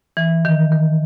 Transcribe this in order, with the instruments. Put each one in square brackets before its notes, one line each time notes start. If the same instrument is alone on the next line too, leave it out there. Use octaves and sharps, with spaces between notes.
[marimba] E3
D#3
D#3